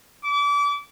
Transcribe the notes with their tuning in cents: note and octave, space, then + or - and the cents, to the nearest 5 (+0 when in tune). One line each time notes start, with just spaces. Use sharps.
D6 -30